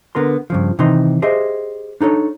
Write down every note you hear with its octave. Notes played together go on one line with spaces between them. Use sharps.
D3 B3 A#4 C6
G2 C#3 F3
C3 D#3 E3 D#4 C6
G4 G#4 C5 D#5 E5
D4 D#4 A4 C#5